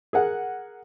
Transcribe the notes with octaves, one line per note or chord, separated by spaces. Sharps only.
G#4 A#4 F#5